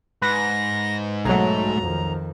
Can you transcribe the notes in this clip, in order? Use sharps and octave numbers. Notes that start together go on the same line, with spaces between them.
G#2 B4 A#6
B1 F#3 G#3 A3 A#5
F2 D#3